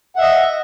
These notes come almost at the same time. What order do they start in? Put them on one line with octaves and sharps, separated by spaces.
F#5 E5 D#5